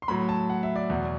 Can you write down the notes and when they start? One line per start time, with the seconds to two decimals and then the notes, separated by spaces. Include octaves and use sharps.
0.02 C6
0.08 A2 F#3 B5
0.29 A5
0.50 F#5
0.63 E5
0.76 D5
0.90 E2 B2 F#3